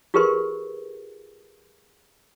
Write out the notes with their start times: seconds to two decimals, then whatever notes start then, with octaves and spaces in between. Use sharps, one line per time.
0.14 F4 G4 G#4 A#4 B4 C6